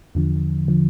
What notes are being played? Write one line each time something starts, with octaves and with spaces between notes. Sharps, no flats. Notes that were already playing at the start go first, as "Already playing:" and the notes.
E2 D3 F3
D3 F3